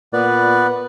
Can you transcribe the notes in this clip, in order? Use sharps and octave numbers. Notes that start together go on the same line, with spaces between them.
A#2 B3 B4 D5